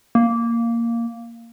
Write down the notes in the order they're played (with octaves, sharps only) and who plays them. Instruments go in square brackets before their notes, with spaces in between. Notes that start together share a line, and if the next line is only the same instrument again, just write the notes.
[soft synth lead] A#3